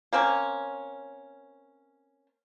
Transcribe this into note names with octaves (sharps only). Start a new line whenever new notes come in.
A#3 C4 C#4